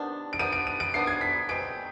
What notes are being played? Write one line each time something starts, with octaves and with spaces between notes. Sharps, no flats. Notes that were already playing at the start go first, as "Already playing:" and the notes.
Already playing: C3 D#3 B3 D4
D7
C3 D#3 B3 D4 D#7
D7
D#7
D7
C3 D#3 B3 D4 C7
G#6
B6
B2 G#3 C4 D7